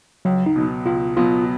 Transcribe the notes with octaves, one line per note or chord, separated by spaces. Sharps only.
C#2 F#3
D#4
B2 F#3 B3
C#2 F4
B2 F#3 B3 F4